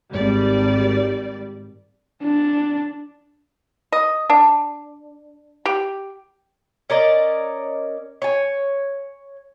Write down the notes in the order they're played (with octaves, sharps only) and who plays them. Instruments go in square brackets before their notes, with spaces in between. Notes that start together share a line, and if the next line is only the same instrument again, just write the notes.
[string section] G#1 G3 D5
[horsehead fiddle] D4
[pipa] D#5
D4
G4
[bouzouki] C#4 A#4 D5 D#5
C#5 G#5